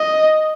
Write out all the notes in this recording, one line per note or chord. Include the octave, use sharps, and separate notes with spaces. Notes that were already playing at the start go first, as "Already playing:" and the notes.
Already playing: D#5